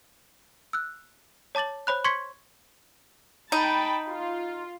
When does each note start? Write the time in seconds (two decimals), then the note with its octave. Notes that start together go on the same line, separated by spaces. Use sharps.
0.73 E6 F#6
1.55 C#5 A5 D6 A6 F#7
1.87 C5 C#5 B5 F#6
2.04 C6 C#6 G#6 B6 C#7
3.52 D#4 G5 A5 B5
4.09 F4